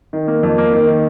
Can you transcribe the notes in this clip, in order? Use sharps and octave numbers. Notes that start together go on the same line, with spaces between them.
D#3
A#3
F2
A#3
D#3
D#3